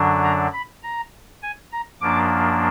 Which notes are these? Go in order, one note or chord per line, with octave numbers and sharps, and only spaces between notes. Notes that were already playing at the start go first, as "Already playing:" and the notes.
Already playing: F#2 D3 F#3 D4
A#5
B5
A#5
G#5
A#5
F#2 F3 A#3 D4 D6